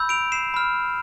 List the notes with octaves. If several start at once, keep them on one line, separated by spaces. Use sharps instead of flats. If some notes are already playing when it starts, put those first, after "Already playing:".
Already playing: B5 E6 G6
D7 F7
C7 E7
B5 F6